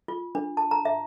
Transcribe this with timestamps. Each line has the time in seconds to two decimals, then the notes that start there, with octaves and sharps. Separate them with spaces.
0.08 F4
0.35 D4
0.57 A5
0.71 A#5
0.85 E5